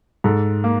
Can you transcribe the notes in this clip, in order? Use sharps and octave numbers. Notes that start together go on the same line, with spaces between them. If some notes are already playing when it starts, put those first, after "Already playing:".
G#2 A4
A#3